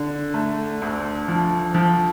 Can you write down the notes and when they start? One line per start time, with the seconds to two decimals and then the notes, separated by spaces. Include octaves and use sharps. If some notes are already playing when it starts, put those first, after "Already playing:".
Already playing: D3
0.34 A3
0.82 D2
1.28 F3
1.75 F3